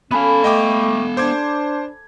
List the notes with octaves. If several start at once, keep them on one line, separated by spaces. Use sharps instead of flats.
B3 C#4 A4 F5 G#5 B5
A3 D#5 G5 D6
D4 C5 D6 G#6